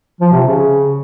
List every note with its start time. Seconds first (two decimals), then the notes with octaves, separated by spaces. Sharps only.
0.21 F3
0.32 C3
0.44 C#3